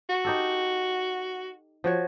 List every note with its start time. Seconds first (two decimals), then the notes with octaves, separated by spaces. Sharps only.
0.10 F#4
0.25 D#4 G4 A4
1.84 F3 F#4 C#5